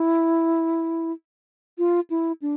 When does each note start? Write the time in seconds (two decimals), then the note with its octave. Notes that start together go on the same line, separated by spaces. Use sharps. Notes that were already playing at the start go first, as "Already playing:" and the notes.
Already playing: E4
1.78 F4
2.10 E4
2.42 D4